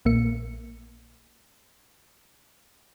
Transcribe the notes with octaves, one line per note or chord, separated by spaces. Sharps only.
A#1 A#2 A#3 C#7